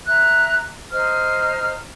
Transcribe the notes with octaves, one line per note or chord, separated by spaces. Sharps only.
E5 A#5 F#6
C5 D#5 A#5 F6